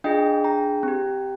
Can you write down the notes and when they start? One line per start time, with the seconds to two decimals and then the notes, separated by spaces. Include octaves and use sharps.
0.04 D4 F4 G#4 D#5 G5
0.44 G5 A#5
0.83 C4 G4